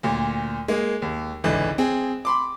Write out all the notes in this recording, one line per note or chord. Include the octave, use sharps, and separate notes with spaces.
D2 A#2
G#3 A#3
D#2
G#1 C#2 D3 E3
C4 G#4
B5 C6 D6